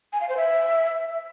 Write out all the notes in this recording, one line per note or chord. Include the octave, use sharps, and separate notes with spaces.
G#5
F5
C5
E5